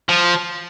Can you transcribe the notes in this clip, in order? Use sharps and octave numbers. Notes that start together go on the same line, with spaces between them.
F3